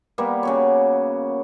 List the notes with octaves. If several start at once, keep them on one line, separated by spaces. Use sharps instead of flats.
G3 A#3 B3
C#3 F#4 C#5